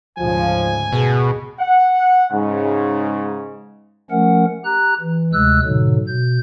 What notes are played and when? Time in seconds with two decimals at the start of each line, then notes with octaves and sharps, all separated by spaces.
0.17 D2 G#2 C#3 F3 G#5
0.92 B2 G#4
1.61 F#5
2.32 G#2 C#3
4.11 F3 A3 C#4 A#4 F#5
4.65 G4 A#5 F#6
5.00 E3
5.33 D2 C3 G#3 E6 F#6
5.64 G#2 B2 D3 F#3
6.07 B2 G6